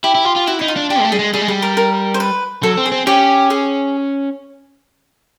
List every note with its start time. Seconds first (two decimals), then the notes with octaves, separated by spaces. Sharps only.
0.04 E4 G4
0.15 E4
0.25 F4
0.36 F4
0.47 E4 F#4
0.59 D#4 E4
0.68 F4
0.76 D4
0.90 D4 G4
1.00 G#3
1.05 A3
1.12 G3 G#4
1.19 G#3
1.34 G3 G#4
1.42 G#3
1.48 G3 G#4
1.62 A#4
1.77 A#4
2.14 C5
2.20 B4
2.63 F#3 A4
2.77 C4
2.85 G#4
2.92 C4
3.07 C#4 G4
3.50 G#4